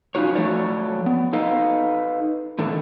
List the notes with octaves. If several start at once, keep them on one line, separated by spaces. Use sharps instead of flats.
F#2 C#4 D#4 F4 F#4 C#5
F3 F#3 A3 A4 C#5 D5
B3
D#4 A4 B4 D#5 F5
A2 D3 D#3 A4